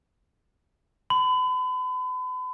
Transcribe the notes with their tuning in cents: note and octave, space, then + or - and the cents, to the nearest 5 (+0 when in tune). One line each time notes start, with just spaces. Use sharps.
B5 +40